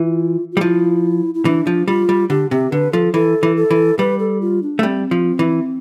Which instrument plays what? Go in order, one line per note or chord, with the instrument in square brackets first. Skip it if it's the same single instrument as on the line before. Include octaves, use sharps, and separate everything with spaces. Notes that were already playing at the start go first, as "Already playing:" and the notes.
Already playing: [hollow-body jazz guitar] E3 [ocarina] F4
[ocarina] F4
[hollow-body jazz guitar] G3
[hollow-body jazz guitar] F3 [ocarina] E4
[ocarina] E4
[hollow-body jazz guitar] E3 [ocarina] D4
[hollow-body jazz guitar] F3
[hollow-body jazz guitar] G3 [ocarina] F4
[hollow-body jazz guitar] G3
[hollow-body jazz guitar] D3 [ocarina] G4
[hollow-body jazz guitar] C3 [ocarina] G4
[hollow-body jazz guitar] D3 [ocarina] B4
[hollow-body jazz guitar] F3 [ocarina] A4
[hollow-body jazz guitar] E3 [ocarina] A4
[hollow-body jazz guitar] E3
[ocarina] A4
[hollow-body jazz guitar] E3
[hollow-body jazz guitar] G3 [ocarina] B4
[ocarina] A4
F4
D4
[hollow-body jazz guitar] A3
[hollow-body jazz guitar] G3 [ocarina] C4
[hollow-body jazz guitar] F3
E3